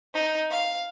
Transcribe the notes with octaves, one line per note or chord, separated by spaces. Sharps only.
D#4
F5